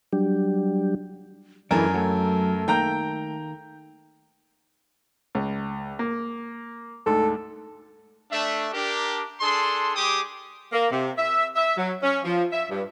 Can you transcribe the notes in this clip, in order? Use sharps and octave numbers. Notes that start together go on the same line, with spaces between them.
F#3 G3 D4 G4
F#2 E3 G#3 A3 D4 A#4 G#5
F#3 A3
D#3 A#3 G5 A#5 G6
C#2
A#3
D2 G#2 A4
A3 D4 E5
D4 G4 A#4
D4 G#4 A4 C6
G3 G4 G#4 G5 D6 D#6
A#3
C3
E5
E5
F#3
C#4
F3
E5
G2